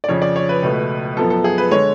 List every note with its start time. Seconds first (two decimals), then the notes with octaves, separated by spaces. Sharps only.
0.04 D5
0.09 F2 C#3 F3 C#5
0.22 D5
0.36 C#5
0.49 B4
0.63 C#2 B2 A3
1.17 F#2 F3 B3 A4
1.30 A4
1.44 G#4
1.58 B4
1.71 D3 G#3 C#5